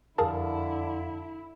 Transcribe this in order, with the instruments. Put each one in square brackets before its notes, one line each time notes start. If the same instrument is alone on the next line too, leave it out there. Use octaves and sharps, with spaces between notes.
[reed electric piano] F2 F5 [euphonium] D3 [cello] E4 [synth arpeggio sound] G#4 A#4 A5